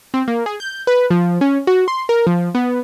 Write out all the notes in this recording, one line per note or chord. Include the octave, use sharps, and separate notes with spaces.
C4
A#3
G#4
G6
B4
F3
C#4
F#4
C6
A#4
F3
B3